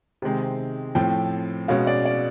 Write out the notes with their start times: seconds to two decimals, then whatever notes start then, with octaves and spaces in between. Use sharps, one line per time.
0.22 C3 D#3 G#3 C4
0.95 A2 F3 A3 C4 G5
1.68 B2 G#3 C#4 F5
1.87 D5
2.05 D5